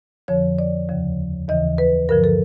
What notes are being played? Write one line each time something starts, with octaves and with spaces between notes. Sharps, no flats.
F2 D3 F3 C#5
D5
D#2 C#3 F3
D#2 C#3 E3 D#5
B4
G2 D3 F3 A#4
A4